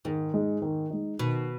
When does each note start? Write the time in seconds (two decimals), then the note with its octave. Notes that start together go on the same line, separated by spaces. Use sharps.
0.05 G#2 D#3
0.34 G#3 D#4
0.62 D#3
0.90 G#3 D#4
1.19 B2 D#3